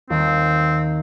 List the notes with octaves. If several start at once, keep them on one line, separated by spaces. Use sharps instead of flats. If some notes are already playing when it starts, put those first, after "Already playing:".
D#2 C4